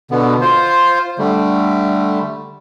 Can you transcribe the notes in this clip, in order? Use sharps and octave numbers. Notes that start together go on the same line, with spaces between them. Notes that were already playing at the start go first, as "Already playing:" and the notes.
B2 D3 B3
F4 C5
D3 G3 A3